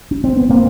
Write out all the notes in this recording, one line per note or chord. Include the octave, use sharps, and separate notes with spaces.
C#4
C4
B3
A#3 C4